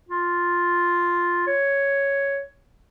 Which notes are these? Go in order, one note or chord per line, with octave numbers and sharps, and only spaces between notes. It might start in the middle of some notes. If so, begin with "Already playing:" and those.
F4
C#5